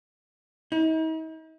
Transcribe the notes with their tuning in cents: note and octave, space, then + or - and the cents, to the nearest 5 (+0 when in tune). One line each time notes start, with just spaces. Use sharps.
D#4 +45